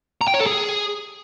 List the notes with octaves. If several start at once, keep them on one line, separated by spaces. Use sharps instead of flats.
A#5
G5
C#5
A4
G#4